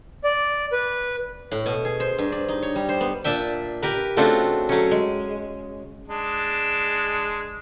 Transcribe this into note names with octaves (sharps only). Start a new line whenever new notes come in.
D5
B4
A2
B2
G#4
C5
G2
D5
D#4
C#5
G3
C5
B3
A#2 D4 E5 G5
G4 A#4 B4
C#3 A3 C4 D4 F4 F#4
F#3 A3 C#4
G#3
G#3 D4